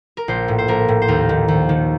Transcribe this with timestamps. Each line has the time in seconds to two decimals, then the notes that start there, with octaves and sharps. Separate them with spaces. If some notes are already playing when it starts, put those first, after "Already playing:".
0.17 A#4
0.28 A#1 C5
0.48 A2
0.58 C5
0.68 A#1 A#4
0.88 A2
1.02 C5
1.08 D#2 A#4
1.29 D#3
1.48 D#2
1.69 D#3